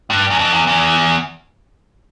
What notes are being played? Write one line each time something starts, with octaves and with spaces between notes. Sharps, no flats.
G2
E2
F2
E2
E2